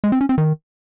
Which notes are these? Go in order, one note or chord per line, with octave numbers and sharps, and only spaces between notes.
G#3
C4
C#4
C4
D#3